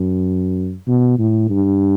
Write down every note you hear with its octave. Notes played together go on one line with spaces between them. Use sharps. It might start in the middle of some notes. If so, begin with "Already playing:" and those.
Already playing: F#2
B2
A2
G2